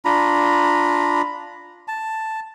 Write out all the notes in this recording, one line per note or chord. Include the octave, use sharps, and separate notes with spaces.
D4 F4 A#5 B5
A5